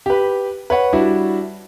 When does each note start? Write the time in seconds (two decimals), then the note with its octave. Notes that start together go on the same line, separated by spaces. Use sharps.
0.06 G4 B4
0.70 B4 C#5 F#5
0.93 G3 D4 E4 F#4